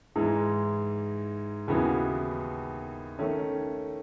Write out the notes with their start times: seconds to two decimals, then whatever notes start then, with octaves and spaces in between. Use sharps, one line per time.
0.16 G#2 E3 G#3
1.68 D#2 C#3 E3 B3 F#4
3.19 D#3 A3 C#4